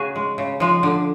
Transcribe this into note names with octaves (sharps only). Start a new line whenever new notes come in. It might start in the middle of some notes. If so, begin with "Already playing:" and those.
Already playing: C#3 F#4 G#4
G#3
C#3
F3 G#3
D3